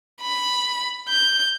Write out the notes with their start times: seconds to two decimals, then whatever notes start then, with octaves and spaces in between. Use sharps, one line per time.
0.21 B5
1.09 G6